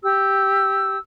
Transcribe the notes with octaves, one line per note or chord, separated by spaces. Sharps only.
G4 E6